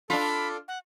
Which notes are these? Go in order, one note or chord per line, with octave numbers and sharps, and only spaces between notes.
D4 F4 A4 B5
F#5